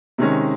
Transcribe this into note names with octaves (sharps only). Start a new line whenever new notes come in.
C3 D#3 G#3 C#4